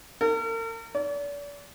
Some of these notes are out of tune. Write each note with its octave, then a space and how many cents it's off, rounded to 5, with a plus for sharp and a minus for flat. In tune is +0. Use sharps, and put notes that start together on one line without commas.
A#4 -45
D5 -40